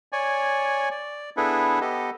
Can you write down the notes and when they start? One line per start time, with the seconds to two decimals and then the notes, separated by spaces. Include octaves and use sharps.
0.12 C#5 D5 G#5
0.91 D5
1.37 B3 D4 E4 G#4 A4 B4
1.81 B3 G4 A4 D#5